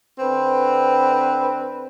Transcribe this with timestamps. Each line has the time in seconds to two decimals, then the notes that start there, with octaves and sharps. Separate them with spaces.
0.19 D3 C4 B4